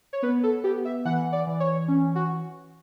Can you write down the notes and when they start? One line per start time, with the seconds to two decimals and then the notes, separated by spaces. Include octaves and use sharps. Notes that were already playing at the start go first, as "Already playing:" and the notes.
0.13 C#5
0.23 B3 B4
0.43 A4
0.64 B3 G4
0.85 E5
1.05 E3 F#5
1.32 D5
1.47 E3
1.60 C#5
1.88 C#4
2.15 F#4